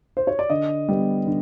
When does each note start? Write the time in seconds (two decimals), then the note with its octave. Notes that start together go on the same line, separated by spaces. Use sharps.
0.17 C5
0.27 C#5
0.39 D5
0.50 D3 D#5
0.89 G3 B3
1.27 D3